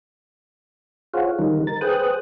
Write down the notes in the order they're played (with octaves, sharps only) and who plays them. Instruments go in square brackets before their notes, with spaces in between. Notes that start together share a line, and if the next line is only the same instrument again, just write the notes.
[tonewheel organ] F4 G#4 C5 C#5 F5 F#5
D#3 G3 D#4 A#4
A#4 A6
G#4 B4 C5 G5 D#6 F#6